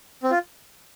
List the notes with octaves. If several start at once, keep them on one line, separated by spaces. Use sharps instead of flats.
C4
F4